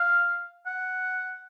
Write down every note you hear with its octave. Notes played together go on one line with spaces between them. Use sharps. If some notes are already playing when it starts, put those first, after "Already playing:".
Already playing: F5
F#5